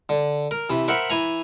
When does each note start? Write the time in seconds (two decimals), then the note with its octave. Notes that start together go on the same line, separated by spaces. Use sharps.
0.09 D3
0.51 A#4
0.70 C3 E3
0.88 A#4 C5 E5 F#5 B5
1.10 E3 G#5 A#5